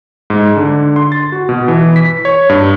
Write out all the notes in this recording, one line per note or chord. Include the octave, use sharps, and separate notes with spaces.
G#2
D3
C6
A6
F#4
B2
E3
B6
C#5
G2